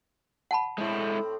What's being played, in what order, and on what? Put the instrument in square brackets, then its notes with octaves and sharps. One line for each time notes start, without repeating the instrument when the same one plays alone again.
[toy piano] F#5 A5 B5
[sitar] A2 C4 [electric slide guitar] G#3 E4